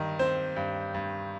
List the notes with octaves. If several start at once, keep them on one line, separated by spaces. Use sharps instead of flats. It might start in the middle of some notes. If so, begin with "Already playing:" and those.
Already playing: G2 D#3
C4 C5
G2
G2